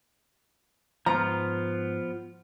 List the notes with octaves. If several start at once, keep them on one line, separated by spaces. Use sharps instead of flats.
G#2 F3 B3 F4 A#5